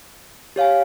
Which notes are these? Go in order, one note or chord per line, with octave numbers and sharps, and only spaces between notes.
G4 C#5 F5 G#5